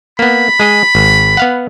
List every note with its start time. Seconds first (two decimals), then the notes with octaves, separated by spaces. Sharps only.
0.19 A#3 B3 B5
0.60 G#3 G#4 D#5
0.95 G#1
1.37 B3 F5 F#5